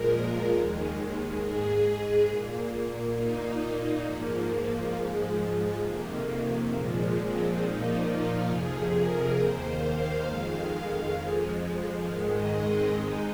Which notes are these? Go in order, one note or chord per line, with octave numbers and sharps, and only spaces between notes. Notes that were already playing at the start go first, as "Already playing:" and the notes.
Already playing: A#2 F3 G#3 A#4
D#2 D#3 G#3
G#2 G#3 G#4
A#2 A#3
A#2 A#3 D#4
G#2 F3 A#3
G#2 F3 G#3
F2 C3 D#3 A#3
A#2 F3 G#3
C4
A#2 F3 A#3 D#4
F4
F2 C3 F3 G#4
A#4
D#2 D#3 A#3 C5
F5
F2 D#3 G#3 F5
F2 F3 G#3
G#2 D#3 G#3 F5
D#5
C4
G#2 G#3 D#4